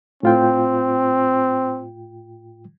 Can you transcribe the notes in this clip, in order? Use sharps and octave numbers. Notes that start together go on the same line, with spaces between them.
A2 C4 F4 G5